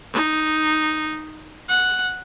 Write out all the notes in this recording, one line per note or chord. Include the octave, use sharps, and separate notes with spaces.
D#4
F#5